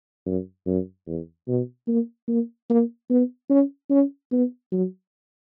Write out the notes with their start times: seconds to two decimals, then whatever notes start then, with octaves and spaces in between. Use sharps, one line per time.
0.26 F#2
0.67 F#2
1.07 E2
1.48 B2
1.88 A#3
2.28 A#3
2.70 A#3
3.10 B3
3.50 C#4
3.91 C#4
4.32 B3
4.72 F#3